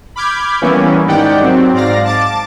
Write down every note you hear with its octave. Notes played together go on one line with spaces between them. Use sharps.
B5 D6 F6 G6 G#6
E3 G3 A#3 B3 C#4 E4
G#2 D#3 G4 D5 F#5 G5
F#3 C4
G#2 D5 F5 A#6
A5 D6 A6